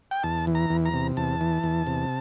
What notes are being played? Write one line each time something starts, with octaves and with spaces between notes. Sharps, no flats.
G5
E2 A5
E3
A#5
E2
A#5
C3
E2 A5
E3
E2
C3